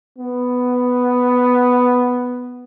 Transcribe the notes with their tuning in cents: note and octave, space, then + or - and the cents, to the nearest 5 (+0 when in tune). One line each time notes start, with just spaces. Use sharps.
B3 +5